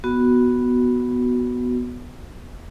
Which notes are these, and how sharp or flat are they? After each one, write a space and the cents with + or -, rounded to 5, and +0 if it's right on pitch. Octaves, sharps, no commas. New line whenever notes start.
B3 +0 F#4 +0